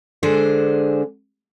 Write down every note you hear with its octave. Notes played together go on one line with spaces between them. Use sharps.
D3 G#3 D4 G#4 C5